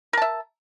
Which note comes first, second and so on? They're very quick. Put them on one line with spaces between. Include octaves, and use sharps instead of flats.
A#4 A5 E5